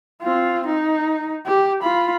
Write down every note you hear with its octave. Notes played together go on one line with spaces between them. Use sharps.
C4 F4
D#4
G4
F4 B5